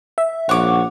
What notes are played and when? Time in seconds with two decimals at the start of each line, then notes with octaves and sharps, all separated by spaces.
0.18 E5
0.49 A#1 C#5 F#5 D6